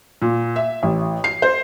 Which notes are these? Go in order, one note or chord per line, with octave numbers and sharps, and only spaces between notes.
A#2
E5
A1
C7
C5